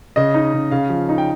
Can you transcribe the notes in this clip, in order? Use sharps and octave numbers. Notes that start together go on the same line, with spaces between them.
C#3 D#5
D#4
C#3
C#3 F5
F3
D#4
G5